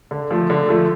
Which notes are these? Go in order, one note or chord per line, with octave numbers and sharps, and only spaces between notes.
D3
F3 A3
D3
F3 A3